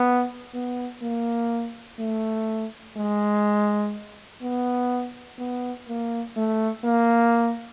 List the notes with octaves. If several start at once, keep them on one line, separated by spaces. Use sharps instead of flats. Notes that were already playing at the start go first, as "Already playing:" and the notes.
Already playing: B3
B3
A#3
A3
G#3
B3
B3
A#3
A3
A#3